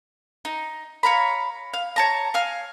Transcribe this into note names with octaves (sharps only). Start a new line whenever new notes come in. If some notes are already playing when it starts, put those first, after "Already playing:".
D#4
C#5 F5 A#5 B5
F5
C#5 A5 A#5
F5 G#5 F6